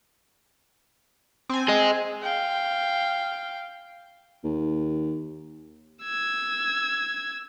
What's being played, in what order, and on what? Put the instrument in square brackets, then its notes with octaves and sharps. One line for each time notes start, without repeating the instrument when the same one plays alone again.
[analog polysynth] C4 G#5
[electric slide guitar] G#4 D#5
[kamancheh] F5 G5
[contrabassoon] D#2
[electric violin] E6 G#6